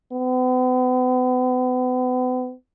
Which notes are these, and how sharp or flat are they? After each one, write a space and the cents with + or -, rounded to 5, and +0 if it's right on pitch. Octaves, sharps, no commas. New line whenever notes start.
B3 +40